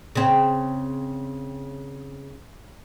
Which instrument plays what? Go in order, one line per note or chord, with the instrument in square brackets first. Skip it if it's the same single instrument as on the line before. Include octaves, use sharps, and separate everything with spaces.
[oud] C#3 C4